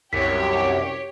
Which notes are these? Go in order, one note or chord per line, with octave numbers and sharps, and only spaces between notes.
C2 F#2 G4 C#5 B6